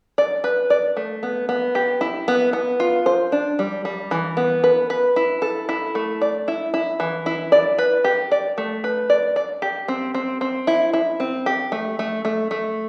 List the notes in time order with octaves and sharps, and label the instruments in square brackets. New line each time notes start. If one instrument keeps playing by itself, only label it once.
[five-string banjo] D5
B4
D5
A3
B3
B3
G4
E4
B3
B3
F4
C5
D4
G3
G3
E3
B3
B4
B4
E4
A4
E4
A3
D5
E4
E4
E3
E4
D5
B4
G4
D5
A3
B4
D5
D5
G4
C4
C4
C4
E4
E4
C4
G4
A3
A3
A3
A3